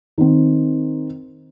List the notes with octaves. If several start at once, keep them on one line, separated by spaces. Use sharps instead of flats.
D#3 C4